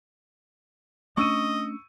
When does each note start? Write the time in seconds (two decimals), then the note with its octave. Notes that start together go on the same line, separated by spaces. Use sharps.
1.17 A3 C#4 D4 D#5 C#6 E6 D#7